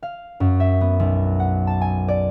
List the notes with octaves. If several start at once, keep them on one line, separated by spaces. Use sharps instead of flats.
F5
F#2
E5
B3
B1
F#5
A5
G#5
D5